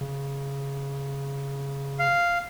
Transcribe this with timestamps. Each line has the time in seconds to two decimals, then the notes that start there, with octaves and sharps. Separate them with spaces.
0.01 C#3
1.99 F5